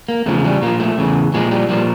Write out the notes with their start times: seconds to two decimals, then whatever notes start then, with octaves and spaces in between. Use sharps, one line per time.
0.09 A#3
0.26 E2 C#3 F3 A3
0.44 G3
0.61 A#2 F3 A#3
0.80 A3
0.98 E2 C#3 E3
1.34 A#2 F3 G#3
1.51 G3
1.69 A#2 F3 G3